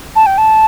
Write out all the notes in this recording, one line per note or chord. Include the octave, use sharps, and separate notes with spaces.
A5
G5
A5